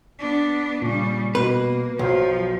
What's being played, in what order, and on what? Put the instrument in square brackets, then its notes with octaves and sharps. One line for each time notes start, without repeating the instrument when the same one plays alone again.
[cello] B3 D4
[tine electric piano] A#2 [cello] C#3 G3
[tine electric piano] B2 [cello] A#3 [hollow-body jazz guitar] B4
[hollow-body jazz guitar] B1 [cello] F3 [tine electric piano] F#3 C5